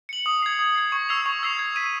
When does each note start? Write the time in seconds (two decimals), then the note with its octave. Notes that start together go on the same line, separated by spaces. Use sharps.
0.09 C#7 F#7
0.26 D#6
0.42 G#6 C7
0.59 D#6
0.75 G#6 C7
0.92 C#6
1.09 E6 G#6 C7 F7
1.26 C#6
1.43 E6 G#6 C7 F7
1.59 G#6
1.76 B6 D#7